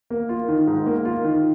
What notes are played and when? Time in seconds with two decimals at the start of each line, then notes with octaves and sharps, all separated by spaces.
0.10 A#3
0.29 F4
0.48 D#3
0.67 G#2
0.86 A#3
1.05 F4
1.24 D#3